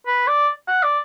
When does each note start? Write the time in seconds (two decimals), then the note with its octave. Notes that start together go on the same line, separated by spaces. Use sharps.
0.07 B4
0.27 D5
0.68 F#5
0.83 D5